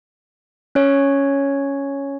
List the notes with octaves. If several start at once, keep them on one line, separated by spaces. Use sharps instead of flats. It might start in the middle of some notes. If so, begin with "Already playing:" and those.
C#4 C#5